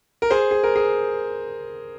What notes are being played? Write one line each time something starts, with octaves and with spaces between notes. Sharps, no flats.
A#4
G#4 C5
G#4
A#4
G#4